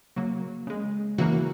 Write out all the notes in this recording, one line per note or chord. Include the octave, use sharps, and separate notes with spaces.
C#3 F#3 A#3
C#3 G#3
C#3 E3 A#3 F#4